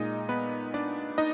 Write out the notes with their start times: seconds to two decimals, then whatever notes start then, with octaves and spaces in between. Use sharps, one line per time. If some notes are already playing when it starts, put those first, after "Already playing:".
Already playing: A#2 G#3 D#4 D#5
0.29 B3 B4
0.74 D4 D5
1.18 D#4 D#5